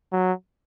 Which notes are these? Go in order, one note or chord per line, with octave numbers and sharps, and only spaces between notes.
F#3